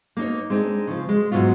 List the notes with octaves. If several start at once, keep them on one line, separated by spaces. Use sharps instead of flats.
A#3 D#4 C#5
G#3 C4 D4 D#4
C#3 F3
G#3
G#2 B2 F#3 F4